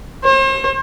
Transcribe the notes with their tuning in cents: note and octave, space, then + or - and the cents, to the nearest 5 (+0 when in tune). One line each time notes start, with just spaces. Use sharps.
C5 +40